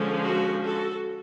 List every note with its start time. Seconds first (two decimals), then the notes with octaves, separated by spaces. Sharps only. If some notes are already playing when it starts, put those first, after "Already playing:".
Already playing: D3 F3 G#3 C#4
0.25 F#4
0.65 F#4 A4